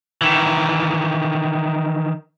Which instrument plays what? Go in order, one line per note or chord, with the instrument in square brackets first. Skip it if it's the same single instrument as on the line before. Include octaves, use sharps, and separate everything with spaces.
[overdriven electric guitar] D#3 E3